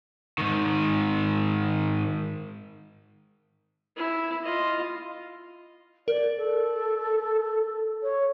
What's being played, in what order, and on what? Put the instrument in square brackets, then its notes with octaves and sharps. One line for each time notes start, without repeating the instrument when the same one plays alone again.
[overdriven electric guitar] G#2 D#3
[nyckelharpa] E4
F4 D#5
[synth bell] A#4 [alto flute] D5
[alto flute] A4
C#5